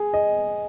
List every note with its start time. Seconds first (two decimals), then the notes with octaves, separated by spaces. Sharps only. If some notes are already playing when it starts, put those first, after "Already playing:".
Already playing: G#4
0.14 D#5